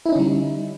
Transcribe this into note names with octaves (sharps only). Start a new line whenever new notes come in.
D3 G3 C#4 D#4 E4